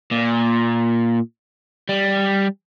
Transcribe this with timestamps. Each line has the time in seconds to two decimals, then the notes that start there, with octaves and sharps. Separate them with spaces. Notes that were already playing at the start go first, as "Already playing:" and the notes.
0.11 A#2
1.89 G3